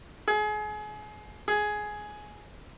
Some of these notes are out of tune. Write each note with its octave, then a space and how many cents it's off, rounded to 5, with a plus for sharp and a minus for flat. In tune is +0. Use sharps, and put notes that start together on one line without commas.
G#4 +30
G#4 +10